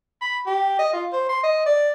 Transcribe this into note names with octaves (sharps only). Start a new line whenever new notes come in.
B5
G4
D#5
F4
C5
C6
D#5
D5